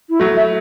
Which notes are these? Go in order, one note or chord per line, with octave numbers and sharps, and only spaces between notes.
E4
F#3 A3 F#4
E5